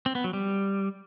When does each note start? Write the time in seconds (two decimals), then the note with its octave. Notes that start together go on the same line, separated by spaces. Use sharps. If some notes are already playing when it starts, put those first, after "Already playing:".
0.06 C4
0.15 B3
0.24 F#3
0.33 G3